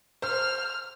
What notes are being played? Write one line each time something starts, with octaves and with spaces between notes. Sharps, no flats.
C5 F6